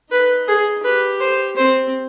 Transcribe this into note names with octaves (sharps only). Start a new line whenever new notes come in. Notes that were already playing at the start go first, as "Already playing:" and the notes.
D#4 B4
G#4
G4 B4
C5
C4 C5